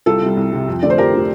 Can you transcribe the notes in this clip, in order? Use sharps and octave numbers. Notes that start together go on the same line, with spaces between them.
C2 F4 A4
C3 G3
C2
C3 G3
F2
D3 A3 D5
C5
F2 G4 A#4
D3 A3